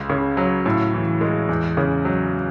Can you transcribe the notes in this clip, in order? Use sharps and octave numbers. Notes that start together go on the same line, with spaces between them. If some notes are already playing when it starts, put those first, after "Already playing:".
Already playing: C#2
C#3
F#3
A2
E3
G#3
E2
C#3
F#3